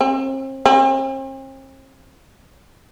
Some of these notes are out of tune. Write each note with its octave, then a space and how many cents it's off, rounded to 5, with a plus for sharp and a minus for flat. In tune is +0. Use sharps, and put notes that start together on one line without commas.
C4 +40
C4 +45